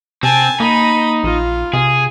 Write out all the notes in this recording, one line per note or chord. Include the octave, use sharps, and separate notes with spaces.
C3 C4 G#5 A5
A#3 D#4 B5
A#1 F4
C3 G#4